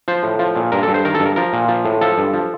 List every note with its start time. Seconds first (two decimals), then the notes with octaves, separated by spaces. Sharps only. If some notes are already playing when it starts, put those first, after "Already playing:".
0.08 F3 C5
0.23 A2
0.39 F3
0.56 A#2
0.72 G2 A#4
0.83 A4
0.88 G2
0.94 C5
1.05 D#3 A#4
1.15 A4
1.20 G2
1.26 A#4
1.36 F3 A#4
1.53 A#2
1.69 F3
1.85 A2
2.01 F3 A4
2.18 G2
2.34 F3